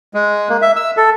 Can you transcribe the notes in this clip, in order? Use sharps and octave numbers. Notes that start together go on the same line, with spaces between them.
G#3
A#3
E5
E6
A4